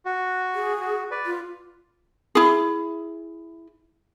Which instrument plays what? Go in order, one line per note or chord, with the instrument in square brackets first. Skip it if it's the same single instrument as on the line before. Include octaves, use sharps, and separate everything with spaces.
[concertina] F#4
[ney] G#4
[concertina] F#4
B4 D5
[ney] F4
[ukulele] E4 G#4